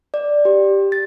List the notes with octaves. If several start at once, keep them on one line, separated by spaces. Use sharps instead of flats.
D5
G4
A6